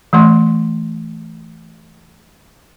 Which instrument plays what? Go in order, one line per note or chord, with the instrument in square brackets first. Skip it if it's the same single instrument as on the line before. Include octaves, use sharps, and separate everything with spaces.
[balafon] E3 A3 C6